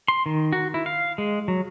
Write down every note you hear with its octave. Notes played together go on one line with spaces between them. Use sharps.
C6
D#3
F#4
E4
F5
G#3
F#3